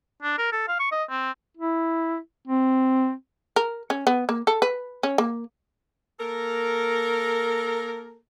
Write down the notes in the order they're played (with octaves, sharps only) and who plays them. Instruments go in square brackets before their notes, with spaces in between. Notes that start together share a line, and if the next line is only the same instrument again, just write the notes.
[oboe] D4
A#4
A4
F5
C#6
D#5
C4
[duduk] E4
C4
[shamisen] A#4
C#4
B3
A#3
A4
B4
C#4
A#3
[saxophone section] A#3 A4 A#4